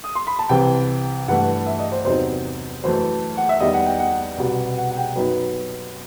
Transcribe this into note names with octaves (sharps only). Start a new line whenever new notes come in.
D#6
C6
B5
A5
C2 C3 E3 G5
G2 E3 A3 F#5
E5
D#5
C5
E2 C3 F#3 C4 D#4 C5
F#2 E3 A3 C5
F#5
E5
E2 D#3 G3 D#5
F#5
G5
F#5
C2 B2 G3 B3
F#5
F#5
G5
F#2 F#3 B3 D#4 B4